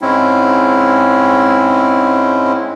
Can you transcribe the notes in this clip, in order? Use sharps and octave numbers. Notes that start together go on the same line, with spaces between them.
G#2 G#3 C4 C#4 E4